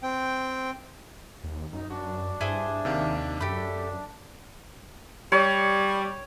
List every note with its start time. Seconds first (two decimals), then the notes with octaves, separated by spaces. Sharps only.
0.02 C4 G5
1.44 D#2
1.73 F#2 D#4
1.90 F#2 D4 F#4
2.41 G2 E4 G#4 C5
2.85 D#2 C3 D#3 F5
3.41 F#2 A3 G4 B5
5.32 G3 C#5